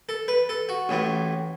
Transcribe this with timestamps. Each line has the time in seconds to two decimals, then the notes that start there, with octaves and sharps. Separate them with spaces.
0.09 A4
0.28 B4
0.49 A4
0.69 F#4
0.89 A1 A2 E3